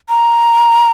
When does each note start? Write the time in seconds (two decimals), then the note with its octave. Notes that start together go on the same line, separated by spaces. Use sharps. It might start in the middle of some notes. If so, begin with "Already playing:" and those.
0.09 A#5